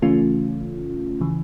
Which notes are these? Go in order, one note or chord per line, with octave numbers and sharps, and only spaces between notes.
C#3 E3 A3 C#4 F4
C#3 E3